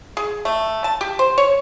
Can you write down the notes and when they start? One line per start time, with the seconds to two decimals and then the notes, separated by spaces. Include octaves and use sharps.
0.17 G#4
0.45 A3
0.84 A5
1.01 G4
1.19 C5
1.38 C#5